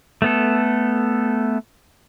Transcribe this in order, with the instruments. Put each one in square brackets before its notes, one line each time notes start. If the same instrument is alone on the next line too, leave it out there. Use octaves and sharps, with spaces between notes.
[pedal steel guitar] A3 B3 A4